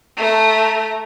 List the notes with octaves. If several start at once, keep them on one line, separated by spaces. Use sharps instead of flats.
A3 A#5